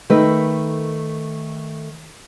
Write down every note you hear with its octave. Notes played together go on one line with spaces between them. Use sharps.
D#3 A3 A#4 B4